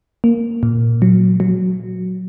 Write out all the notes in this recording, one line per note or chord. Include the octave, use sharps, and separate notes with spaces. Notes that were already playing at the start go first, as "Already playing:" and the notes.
A#3
A#2
F#3
F#3